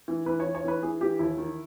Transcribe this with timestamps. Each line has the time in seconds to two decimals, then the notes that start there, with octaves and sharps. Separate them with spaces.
0.08 E3
0.26 E3 B4
0.40 C#5
0.45 E3
0.55 C#5
0.64 E3 B4
0.83 E3 G#4
1.01 E3 G4
1.19 D#2 E4
1.38 D#3